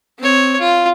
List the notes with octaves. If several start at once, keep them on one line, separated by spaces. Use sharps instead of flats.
C4 C#5
F4